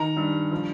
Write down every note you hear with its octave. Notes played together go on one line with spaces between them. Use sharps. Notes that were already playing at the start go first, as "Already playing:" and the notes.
Already playing: D#3 A#5
G2
F3